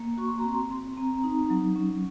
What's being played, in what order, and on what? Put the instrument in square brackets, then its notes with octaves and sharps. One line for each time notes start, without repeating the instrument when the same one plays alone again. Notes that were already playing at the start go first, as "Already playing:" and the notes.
Already playing: [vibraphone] A#3
F#4 C#6
C6
A#5
C4 C6
C4
C4 A#5
D#4
F#3
C#4